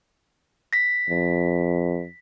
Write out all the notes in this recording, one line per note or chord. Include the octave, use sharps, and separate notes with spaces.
A#6 B6
F2